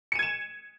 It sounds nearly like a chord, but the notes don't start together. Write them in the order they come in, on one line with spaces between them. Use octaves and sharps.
C#7 D#7 G#6 E7